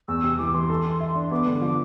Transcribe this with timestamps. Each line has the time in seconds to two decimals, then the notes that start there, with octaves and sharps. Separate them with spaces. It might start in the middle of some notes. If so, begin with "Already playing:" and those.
0.08 E2 E6
0.24 C3
0.38 E3 D6
0.54 E3 C6
0.70 A4
0.85 A4
1.00 E5
1.16 D4
1.31 B3 D6
1.47 D3
1.62 F3